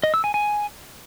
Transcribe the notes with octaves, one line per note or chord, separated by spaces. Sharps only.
D#5
E6
G#5
G#5